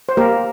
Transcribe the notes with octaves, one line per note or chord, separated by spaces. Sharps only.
C5
A#3 G4 A#4